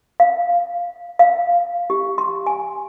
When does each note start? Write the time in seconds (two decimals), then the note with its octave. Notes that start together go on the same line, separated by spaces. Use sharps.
0.20 F5
1.19 F5
1.90 G4
2.18 C6
2.46 G#5